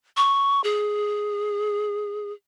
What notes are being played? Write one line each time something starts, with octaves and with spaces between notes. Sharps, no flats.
C#6
G#4